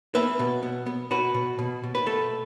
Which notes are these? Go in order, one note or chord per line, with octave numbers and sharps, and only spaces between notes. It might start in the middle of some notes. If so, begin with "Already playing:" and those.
B3 B4 E5
B2
B3
B3
B2 F#4 B4
B2
B2
B2
B4
A3 A4